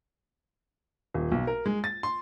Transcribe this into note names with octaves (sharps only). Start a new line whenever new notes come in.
D#1
B1
A#4
G#3
A6
C6